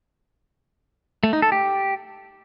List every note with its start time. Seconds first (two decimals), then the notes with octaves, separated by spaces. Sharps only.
1.23 A3
1.33 D#4
1.42 A4
1.52 G4